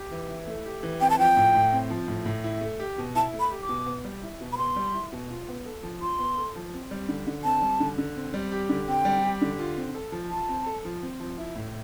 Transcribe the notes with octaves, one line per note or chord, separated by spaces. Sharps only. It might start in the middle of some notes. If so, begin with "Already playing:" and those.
Already playing: G4
E3
E4
A3
G4
E3
C4 G5
A5
F3 G5
A2
A2
C4
F3
A2
A2
E4
A3
G4
B2
E4 A5
A3
B5
G4
D6
B2
B3
G3
E4
B2
B5
B3 C6
G3
E4
B2
F4
B3
A4
F3
F4 C6
B3
A4
F3
C4
G3
D3
D3
C4 A5
G3
D3
D3
C4
G3
G4
D3
C4 G5
G3
G4
D3
F4
C4
A4
F3
F4 A5
C4
A4
F3
C4
F3
E4
A2